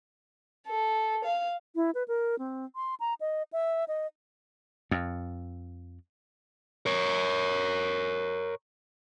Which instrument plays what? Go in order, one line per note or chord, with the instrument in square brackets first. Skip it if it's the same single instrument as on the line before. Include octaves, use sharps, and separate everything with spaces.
[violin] A4
F5
[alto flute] E4
B4
A#4
C4
C6
A#5
D#5
E5
D#5
[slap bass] F2
[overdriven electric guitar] A#4 C#5